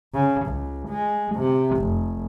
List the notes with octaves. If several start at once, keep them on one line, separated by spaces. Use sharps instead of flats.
C#3
C#2
G#3
C3
F1